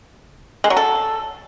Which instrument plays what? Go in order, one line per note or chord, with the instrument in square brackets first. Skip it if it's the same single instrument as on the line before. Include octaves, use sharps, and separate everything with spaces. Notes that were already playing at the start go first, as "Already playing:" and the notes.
[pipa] G#3
F#3
A4